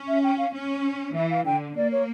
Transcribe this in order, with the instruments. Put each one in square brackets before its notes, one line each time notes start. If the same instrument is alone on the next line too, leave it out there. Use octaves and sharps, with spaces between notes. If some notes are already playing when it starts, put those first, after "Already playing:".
Already playing: [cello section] C#4
[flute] E5
G5
F5
[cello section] C#4
[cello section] E3 [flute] E5
[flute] F5
[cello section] D3 [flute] G5
[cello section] A#3 [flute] D5
[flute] C#5